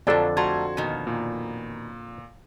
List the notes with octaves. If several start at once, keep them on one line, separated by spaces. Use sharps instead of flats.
F2 D3 F3 F#3 D4 A4 D5
G3 A3 F#4 A#5 C6 G#6
B2 D#3 A#3
A#2